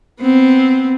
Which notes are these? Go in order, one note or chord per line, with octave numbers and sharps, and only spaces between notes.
B3 C4